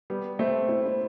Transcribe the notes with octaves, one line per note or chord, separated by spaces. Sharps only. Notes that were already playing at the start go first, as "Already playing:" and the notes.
G3 B3
A3 C4
C4 E4
C4